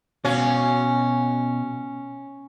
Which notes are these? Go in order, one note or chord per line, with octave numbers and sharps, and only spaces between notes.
B2 C#4 F#4 F5